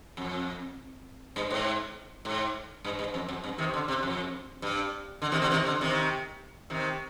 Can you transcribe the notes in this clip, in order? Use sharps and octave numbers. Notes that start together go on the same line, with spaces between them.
F2
G2
G#2
G#2
G2
G2
F2
F2
G2
C3 D#3
D3
C3
F2
G2
D3
C3 D#3
D3
C3 D#3
D3
C3 D#3
C3 D#3